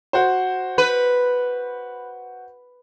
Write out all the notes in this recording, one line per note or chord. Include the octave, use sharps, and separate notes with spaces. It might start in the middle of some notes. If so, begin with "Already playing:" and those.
F#4 C5
B4